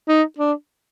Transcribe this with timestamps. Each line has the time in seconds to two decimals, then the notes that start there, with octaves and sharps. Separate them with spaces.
0.08 D#4
0.38 D4